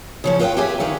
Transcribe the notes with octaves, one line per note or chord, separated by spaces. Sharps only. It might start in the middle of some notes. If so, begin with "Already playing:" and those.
C#3 F3 C#4
F4 B4 C5 D#5 F5 G5
G4 G#4 B4 E5 F5 G#5
D3 D#3 F4 B4